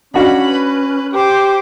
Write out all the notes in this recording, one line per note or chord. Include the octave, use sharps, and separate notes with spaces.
C#4 D4 F#4 F5 F#5 B5
B4
G4 C5 D6